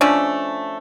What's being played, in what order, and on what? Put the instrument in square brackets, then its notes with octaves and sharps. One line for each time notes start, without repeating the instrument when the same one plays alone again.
[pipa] F3 A3 C#4 D4